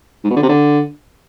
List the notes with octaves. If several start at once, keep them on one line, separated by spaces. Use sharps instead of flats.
G#2
B2
D3
C3
D3